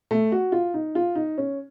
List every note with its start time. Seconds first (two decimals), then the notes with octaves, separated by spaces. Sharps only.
0.11 A3
0.32 F#4
0.52 F4
0.74 D#4
0.95 F4
1.15 D#4
1.38 C#4